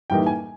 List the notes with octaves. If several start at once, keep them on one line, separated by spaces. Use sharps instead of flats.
A2 E3 G3 A#3 D#4 G5
G#5